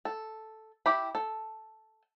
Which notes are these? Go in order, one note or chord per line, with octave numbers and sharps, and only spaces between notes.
A4
E4 G4 B5
A4